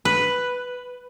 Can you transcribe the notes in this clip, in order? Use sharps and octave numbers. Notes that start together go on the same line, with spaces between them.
B4